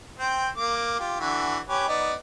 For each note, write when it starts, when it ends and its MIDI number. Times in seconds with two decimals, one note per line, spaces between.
0.18 0.48 60
0.18 0.48 79
0.56 0.96 58
0.56 0.96 86
0.99 1.17 65
0.99 1.17 67
1.20 1.58 50
1.20 1.58 52
1.20 1.58 66
1.69 1.87 61
1.69 1.87 67
1.69 1.87 71
1.88 2.13 59
1.88 2.13 63
1.88 2.13 74